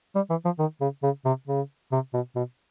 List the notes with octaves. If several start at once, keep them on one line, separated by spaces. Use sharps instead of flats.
G3
E3
F3
D#3
C#3
C#3
C3
C#3
C3
B2
B2